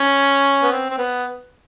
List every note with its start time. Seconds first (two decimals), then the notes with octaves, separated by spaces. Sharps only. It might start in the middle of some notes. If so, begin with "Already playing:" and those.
Already playing: C#4
0.62 B3
0.71 C4
0.90 C4
0.98 B3